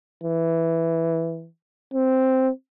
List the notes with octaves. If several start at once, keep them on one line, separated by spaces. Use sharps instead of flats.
E3
C4